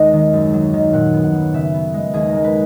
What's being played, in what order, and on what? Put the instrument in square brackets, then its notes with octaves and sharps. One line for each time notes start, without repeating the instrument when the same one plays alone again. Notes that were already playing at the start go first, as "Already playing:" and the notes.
Already playing: [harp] D#2 G#3 D#5
D#3
F#2
F#3
D#3
A#2 F#5
B3
F#5
F#3
C#3 E5
B3
G#3
D#2 G#4
G#3 A#4
B4